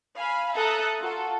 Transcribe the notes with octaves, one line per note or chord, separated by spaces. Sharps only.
F5 G#5 B5
A4 E5 A5 A#5 D#6 F#6
F4 F#4 A4